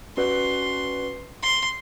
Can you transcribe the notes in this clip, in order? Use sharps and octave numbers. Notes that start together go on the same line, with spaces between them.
C#4 F#4 B4 D5 C6
C6